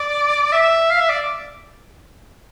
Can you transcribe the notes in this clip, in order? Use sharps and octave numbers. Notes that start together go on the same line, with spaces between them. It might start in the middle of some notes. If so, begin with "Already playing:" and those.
Already playing: D5
E5
F5
E5
D5